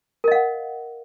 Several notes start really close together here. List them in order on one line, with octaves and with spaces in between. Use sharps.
A#4 D#5 F5 F#5